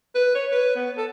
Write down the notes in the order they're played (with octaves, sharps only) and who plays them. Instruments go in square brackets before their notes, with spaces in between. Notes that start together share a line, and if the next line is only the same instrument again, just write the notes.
[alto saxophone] B4
C#5
B4
B3
A4